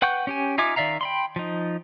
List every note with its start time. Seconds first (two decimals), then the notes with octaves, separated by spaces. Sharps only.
0.02 B4 F#5 G5 C#6 G6
0.27 C#4 G4 G#5
0.58 D#4 F4 E5 G#5 D6
0.76 D#3 D5 E5 F5 A#5
1.01 G5 B5 C6
1.36 F3 D#4